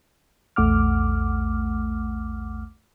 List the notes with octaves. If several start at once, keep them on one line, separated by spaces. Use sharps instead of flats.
A#1 E2 A3 F#5 D6 F6